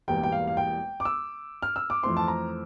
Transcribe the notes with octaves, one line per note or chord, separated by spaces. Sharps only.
E1 E2 E3 G3 A#3 G5
G5
F5
F5
G5
D6
E6
F6
E6
D6
F2 E3 A3 C4 C6
A5
A#5